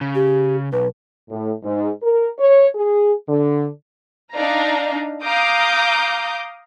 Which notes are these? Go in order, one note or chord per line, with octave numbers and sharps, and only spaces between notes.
C#3
G4
B1 B4
A2
G#2
A#4
C#5
G#4
D3
D4 D#4 F5 A#5
F5 A#5 D6 D#6 G6